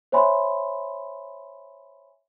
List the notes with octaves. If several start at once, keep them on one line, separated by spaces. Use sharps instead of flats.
C5 C#5 E5 G#5 B5 C6